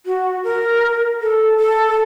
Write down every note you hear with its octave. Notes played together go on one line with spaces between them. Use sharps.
F#4
A#4
A4
A4